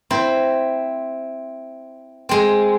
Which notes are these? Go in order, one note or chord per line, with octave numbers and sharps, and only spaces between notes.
C4 E4 C5
G#3 C4